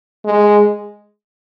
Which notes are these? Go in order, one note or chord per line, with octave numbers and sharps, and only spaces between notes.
G#3